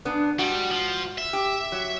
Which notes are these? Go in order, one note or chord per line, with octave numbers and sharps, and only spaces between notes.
C#3 B3 D4
G#2 G3 F#4
F3
E5
G4
F#3